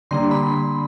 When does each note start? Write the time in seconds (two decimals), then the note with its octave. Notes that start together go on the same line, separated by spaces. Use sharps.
0.11 D3 G3 A#3 D4 C6
0.31 B5